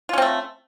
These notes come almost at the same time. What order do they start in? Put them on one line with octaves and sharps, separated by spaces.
F4 C#4 C4 A3